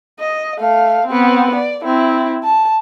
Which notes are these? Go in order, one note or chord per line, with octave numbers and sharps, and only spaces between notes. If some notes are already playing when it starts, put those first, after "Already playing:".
D#5
A3 F5
B3 C4
D5
C4 E4
A5